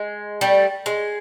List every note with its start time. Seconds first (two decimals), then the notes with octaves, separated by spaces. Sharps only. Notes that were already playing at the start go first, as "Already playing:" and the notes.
Already playing: G#3
0.41 G3 A3
0.86 G#3